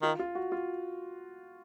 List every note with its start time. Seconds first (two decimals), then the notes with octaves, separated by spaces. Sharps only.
0.02 D#3 F4
0.19 F4
0.35 F#4
0.52 F4